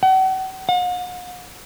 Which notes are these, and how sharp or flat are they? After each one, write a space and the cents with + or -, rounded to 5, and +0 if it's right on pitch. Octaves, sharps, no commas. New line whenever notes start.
F#5 +40
F#5 -45